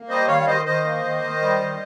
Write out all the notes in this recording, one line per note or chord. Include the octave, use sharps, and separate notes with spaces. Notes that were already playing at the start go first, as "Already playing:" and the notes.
Already playing: A#3
G3 C5 D#5
D#3 C#5 F5
F5
D#3 C5 D#5
D#3 C5 D#5
A#3
D#3
D#3
G3
D#3